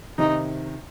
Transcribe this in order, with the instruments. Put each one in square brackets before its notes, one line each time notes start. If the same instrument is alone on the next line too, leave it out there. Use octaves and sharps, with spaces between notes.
[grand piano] C3 D#3 [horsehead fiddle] D#4